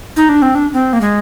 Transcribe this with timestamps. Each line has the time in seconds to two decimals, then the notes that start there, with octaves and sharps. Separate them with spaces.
0.16 D#4
0.29 D4
0.42 C4
0.55 D4
0.73 C4
0.93 A#3
1.01 G#3